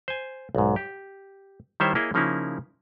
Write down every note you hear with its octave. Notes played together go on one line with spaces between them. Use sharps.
C5 G#5
B1 G#2
G4
D#3 G3 E4 C5 C#5 E5
A#3 E4 G#4 C#5 D#5
C#3 F3 A#3 C#4 D#4 E4